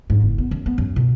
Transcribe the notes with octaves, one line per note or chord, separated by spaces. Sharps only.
G#2
F#1
B3
F#2
B3
F#2
B2